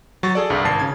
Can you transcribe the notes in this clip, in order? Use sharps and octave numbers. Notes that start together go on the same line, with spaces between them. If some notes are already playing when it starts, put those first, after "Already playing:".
F#3 C#6 A6
G#4 A4 D5
C2 G2
G#1 A5 C7
C#3 G#6